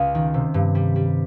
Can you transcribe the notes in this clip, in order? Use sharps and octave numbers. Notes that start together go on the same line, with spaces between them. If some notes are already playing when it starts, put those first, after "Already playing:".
Already playing: C#2 D#5 F5
D#3
C3
G2
G3
G3